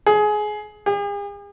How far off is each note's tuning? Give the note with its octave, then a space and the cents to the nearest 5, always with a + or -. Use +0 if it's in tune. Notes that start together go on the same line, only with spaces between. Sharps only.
G#4 +20
G#4 -45